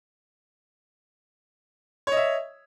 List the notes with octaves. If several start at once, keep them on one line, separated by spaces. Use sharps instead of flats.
C#5 D#5 E5